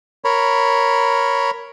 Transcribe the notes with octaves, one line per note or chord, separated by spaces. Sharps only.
A#4 C#5 B5